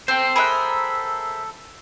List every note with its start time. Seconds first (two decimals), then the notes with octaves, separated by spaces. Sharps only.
0.08 C4 A4 C5 G5
0.36 G#4 A#4 E5 B5 F#6